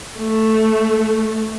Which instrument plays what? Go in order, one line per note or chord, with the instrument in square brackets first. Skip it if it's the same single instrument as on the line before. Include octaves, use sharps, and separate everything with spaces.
[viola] A3